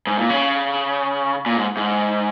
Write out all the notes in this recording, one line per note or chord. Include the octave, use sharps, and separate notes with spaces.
G#2
A#2
C#3
A#2
G#2
G#2